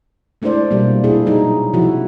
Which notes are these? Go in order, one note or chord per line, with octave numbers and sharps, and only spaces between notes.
G#3 A3 D4 E4 C5 D5
B2 G3 A#3
A#2 D4 E4 G#4
F#3 D#4 G#4
C3 F3 E4 F#4